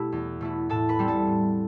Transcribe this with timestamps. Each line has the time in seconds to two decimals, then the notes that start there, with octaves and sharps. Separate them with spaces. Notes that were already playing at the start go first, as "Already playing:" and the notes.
Already playing: B2 A3 E4 G4
0.12 E2
0.41 B2 A3 E4
0.69 A2 A4 A5
0.89 B4 B5
0.99 G3 C4 E4
1.08 A4 A5
1.27 A2